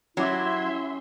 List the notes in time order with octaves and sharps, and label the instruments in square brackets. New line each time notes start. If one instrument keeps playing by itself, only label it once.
[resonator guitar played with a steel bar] F#3 [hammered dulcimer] C#4 G4 D6 [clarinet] E4 [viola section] E5 C6